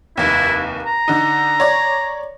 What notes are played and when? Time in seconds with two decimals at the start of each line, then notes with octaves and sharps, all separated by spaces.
0.17 F1 D#2 E4
0.86 A#5
1.08 D3 D#4
1.60 C#5 D5